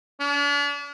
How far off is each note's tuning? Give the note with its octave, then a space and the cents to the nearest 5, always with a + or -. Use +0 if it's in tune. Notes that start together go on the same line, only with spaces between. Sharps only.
D4 -40